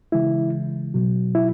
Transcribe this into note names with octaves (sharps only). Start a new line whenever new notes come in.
C#3 E3 G#3 E4
B2 F#3
E4